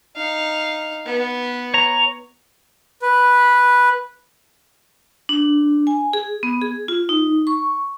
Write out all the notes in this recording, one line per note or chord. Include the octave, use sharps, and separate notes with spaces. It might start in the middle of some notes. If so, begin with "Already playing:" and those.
D#4 F5
B3
C#5 A#5
B4
D4
G#5
G#4
B3
G#4
F4
D#4
C#6